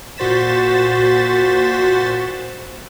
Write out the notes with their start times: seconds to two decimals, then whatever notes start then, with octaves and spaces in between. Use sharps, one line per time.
0.17 A#2 F#4 C5 A6 B6 E7